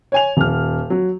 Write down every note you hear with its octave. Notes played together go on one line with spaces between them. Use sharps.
C#5 G#5 F7
D#1 F6
F#3